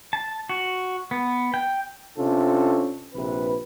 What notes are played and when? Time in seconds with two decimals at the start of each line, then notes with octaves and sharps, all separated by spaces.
0.13 A5
0.49 F#4
1.11 B3
1.54 G5
2.17 C3 C#4 D4 F4 A4
3.13 A#1 C3 B4